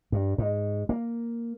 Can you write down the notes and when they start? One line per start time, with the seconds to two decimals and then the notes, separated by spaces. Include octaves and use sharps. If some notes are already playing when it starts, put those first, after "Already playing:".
0.12 G2
0.38 G#2
0.89 A#3